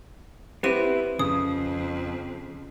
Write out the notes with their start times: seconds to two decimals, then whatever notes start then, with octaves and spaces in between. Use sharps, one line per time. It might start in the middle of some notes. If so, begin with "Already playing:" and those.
0.63 B3 C4 E4 G4 B4 D#7
1.19 F2 C#3 D#6